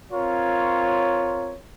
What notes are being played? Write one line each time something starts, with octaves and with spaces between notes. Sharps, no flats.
C4 F4 A#4 C#5